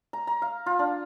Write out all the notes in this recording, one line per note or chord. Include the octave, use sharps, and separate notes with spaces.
A#5
A#5
F5
F4
D4